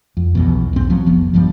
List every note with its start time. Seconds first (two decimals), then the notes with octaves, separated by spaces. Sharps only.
0.17 F2
0.35 B1 E2 B2
0.73 B1 G#2 C4
0.90 F3 F#3
1.06 F1 F3 B3
1.34 A#1 G2 F3 G3